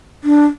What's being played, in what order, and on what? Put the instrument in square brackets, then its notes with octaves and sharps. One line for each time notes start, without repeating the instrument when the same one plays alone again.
[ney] D4